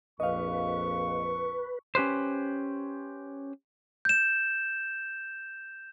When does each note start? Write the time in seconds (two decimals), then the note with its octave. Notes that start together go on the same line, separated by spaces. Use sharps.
0.20 A#1 F2 B4 D#5 F5 C#6
1.95 C#4 G4 B4 C5
4.05 G6 E7